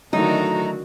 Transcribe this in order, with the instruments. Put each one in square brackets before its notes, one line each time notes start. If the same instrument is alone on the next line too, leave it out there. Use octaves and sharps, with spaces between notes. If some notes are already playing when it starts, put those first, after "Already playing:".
[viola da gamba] D3 D#3 F#4 [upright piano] F#3 A3 E4 [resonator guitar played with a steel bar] D#4 [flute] A#5